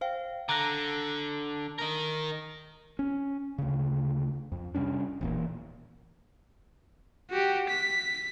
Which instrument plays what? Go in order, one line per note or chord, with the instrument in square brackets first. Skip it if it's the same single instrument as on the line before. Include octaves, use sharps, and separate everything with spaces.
[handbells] C5 F5 G5
[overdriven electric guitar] D3 [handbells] A#5 F#6 A#6
[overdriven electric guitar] D#4 A#4
[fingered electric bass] C#4
D2 C#3
F2
C3 G3 C#4 D4
E1 E2 A#2
[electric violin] F#4 G4
B6